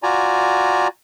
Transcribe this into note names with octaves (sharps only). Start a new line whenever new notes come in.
F4 F#4 D5 G#5 A#5